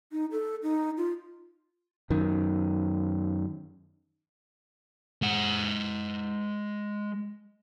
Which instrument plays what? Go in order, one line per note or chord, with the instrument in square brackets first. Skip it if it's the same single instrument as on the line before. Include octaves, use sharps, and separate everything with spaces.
[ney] D#4
A4
D#4
F4
[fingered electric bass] F#2 D#3
[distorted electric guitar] G#3 F#5